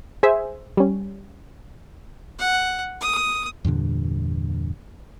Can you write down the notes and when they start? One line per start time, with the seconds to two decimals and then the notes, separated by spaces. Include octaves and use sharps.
0.23 G#4 C5 E5 G#5
0.77 G3 C#4
2.39 F#5
3.01 D#6
3.65 E2 G2 A#2 D3